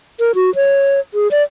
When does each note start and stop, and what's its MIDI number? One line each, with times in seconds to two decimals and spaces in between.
0.20 0.32 70
0.35 0.54 66
0.55 1.00 73
1.14 1.30 68
1.31 1.42 74